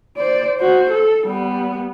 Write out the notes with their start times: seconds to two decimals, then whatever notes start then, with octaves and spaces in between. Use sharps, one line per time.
0.17 C5 D5
0.59 F#4 C5
0.91 A4
1.27 G3 B3